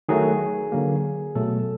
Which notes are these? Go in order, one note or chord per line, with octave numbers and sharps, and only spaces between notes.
D#3 F#3 A3 G#4
D3 F#3 A#3
B2 F#3 A3 A4